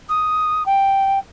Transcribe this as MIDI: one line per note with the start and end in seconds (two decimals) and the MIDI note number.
0.09 0.65 87
0.66 1.18 79